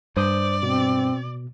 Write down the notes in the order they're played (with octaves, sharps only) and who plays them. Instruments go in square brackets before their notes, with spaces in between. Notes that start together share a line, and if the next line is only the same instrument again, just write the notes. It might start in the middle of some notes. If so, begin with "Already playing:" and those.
[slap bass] G2 [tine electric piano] C5 D#6 G6 [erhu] D5
[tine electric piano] B2 [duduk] C4